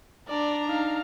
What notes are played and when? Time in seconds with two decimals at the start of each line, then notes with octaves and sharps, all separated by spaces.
0.28 D4 D5 A#5
0.67 D#4 F5